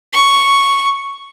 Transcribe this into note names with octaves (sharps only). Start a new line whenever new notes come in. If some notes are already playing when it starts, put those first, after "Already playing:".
C#6